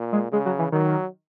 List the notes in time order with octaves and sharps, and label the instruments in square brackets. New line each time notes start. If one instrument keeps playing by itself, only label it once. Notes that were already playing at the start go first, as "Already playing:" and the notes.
Already playing: [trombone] A#2
[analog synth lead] G#3
[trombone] C#3 [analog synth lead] G#3
[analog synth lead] F#3
E3
[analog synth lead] D#3 [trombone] F#3